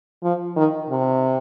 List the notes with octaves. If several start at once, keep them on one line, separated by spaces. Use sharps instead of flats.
F3
D#3
C3